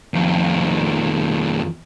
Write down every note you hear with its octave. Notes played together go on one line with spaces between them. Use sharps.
F2 D#3